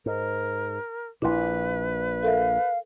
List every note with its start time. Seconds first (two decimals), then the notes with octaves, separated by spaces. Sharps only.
0.06 G#2 A#4
1.22 A#1 A#2 E4 B4 C6
2.23 A4 A#4 E5 F5